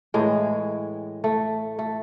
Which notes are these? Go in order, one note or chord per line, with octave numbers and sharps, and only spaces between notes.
A2 E3 G#3
A3
A3